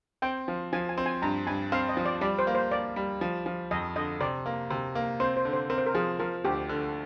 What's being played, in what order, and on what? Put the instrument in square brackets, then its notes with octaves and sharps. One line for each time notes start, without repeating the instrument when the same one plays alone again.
[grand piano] C4 [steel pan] G5
[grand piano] F3
[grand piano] F3 [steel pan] G#5
[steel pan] G#5
[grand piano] C4
[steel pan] G#5
[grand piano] G2 [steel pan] A#5
[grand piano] G2 [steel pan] G#5
[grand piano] C4 [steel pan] F5
[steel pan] D#5
[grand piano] F3
[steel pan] D5
[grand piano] G3 [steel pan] D5
[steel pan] C5
[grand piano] A#3
[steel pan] C5
[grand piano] A#3 [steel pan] D5
[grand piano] G3
F3
F3
[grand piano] F2 [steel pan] D#5
[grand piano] D3 [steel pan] D#5
[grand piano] C3 [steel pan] D5
[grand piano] A#3
C3
A#3
[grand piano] C4 [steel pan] C5
[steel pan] C5
[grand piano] D3
[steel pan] C5
[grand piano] C4 [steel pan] A#4
[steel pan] C5
A#4
[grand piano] F3 [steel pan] G#4
[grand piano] F3 [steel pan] A#4
[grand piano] D2 [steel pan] G4
[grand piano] D3